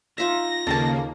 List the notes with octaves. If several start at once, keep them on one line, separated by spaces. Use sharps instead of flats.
D#4 F4 E5 A#6
D#2 C#3 A#3 A4 A5